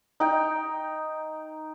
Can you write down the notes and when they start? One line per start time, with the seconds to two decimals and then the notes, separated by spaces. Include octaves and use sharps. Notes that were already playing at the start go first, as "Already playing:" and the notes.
0.20 D#4 G5